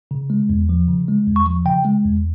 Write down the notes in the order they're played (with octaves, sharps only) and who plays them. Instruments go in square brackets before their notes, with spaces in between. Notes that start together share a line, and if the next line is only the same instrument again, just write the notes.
[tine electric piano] C#3
G#3
E2
F3
C#3
G#3
E2
C#6
F3
C#3 G5
G#3
E2